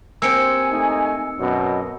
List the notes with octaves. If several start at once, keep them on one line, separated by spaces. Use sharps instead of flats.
A#3 C4 G4 G#5 E6 C#7 D7
A3 D#4
F#2 B2 D#5